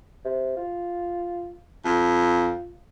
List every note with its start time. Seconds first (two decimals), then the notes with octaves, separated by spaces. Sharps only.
0.25 C3
0.57 F4
1.85 F2 F4